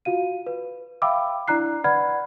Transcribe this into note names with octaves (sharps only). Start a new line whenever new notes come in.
F4 F#4 F5 D#7
B4
E5 F5 G5 B5 D6 E6
D4 E4 D5 A#5 F#6 C7
B4 D5 F#5 B5 F6 G#6